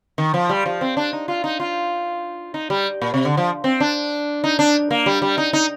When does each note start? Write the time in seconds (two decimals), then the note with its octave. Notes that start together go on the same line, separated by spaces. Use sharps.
0.18 D#3
0.34 F3
0.49 G3
0.66 F3
0.81 C4
0.97 D4
1.13 D#4
1.28 F4
1.44 D#4
1.60 F4
2.54 D#4
2.70 G3
3.02 A#2
3.14 C3
3.25 D3
3.37 F3
3.64 C4
3.80 D4
4.44 D#4
4.59 D4
4.91 A#3
5.06 G3
5.22 G3
5.38 D#4
5.53 D#4